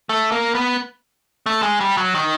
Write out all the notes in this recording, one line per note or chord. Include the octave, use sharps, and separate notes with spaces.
A3
A#3
B3
A3
G#3
G3
F#3
D#3